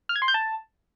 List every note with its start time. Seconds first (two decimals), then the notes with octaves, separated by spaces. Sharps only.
0.09 F6
0.16 G#6
0.22 C6
0.28 G6
0.34 A5